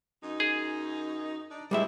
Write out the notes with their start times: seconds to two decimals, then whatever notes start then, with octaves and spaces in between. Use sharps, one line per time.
0.22 F#2 D#4
0.40 G#4
1.50 D4 D#4
1.71 D2 B2 G3 G#3 E4 E5